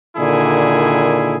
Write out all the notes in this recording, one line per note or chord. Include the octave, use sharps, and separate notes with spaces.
A#2 D3 D#3 E4 G#4